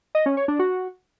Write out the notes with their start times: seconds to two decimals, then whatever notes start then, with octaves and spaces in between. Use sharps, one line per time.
0.15 D#5
0.26 C#4
0.37 C#5
0.48 D4
0.59 F#4